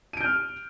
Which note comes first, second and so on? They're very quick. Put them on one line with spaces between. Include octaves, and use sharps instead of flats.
D#7 D7 G6 F6